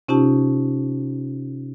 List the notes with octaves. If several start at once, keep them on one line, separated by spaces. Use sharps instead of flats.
C3 C#4 D#4 F4 G4 A5